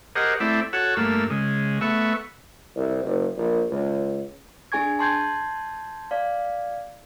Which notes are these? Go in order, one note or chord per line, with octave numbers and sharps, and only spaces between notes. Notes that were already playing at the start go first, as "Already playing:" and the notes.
G4 G#4 A#4 C5 D#5 F#5
A3 C4 E4 D5 E5
F#4 A4 C#5 F#5 E6
G2 A3 A#3 E6
C#3 G#3
A3 B3 E5 C#6
C2
F#1
A#1
C#2
D4 G#4 G#5 C#6 G#6
A5 C6 G6 G#6
D5 F5